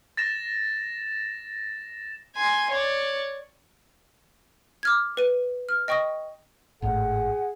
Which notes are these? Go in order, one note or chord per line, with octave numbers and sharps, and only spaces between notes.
A6 A#6 E7
G#5 C6
C#5 D5
D6 F6 G#6
B4 D#7
F6
D#5 G5 C#6 D#6 A#6
G#1 A2 G#4 F#5